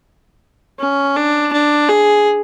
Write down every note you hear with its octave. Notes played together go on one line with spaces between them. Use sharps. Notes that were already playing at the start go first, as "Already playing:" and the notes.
C#4
D4
D4
G#4